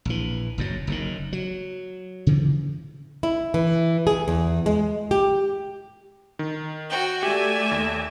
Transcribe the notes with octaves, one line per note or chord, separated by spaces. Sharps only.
A#1 E3
F#1 F#2 F#3
F#1 F#2 A#2 D#3
F#3
C#3 E3 F3
E4
E3
G#4
E2
G#3
G4
D#3
F#4 G5
A3 G4 D5 E5 G#5
D#2